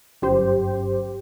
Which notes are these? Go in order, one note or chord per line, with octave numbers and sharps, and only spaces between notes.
G1 F#2 G4 C5